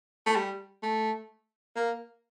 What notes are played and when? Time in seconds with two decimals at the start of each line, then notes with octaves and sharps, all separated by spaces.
0.26 A3
0.36 G3
0.83 A3
1.76 A#3